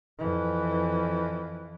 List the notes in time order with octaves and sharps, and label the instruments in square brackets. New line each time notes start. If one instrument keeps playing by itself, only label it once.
[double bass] F2 E3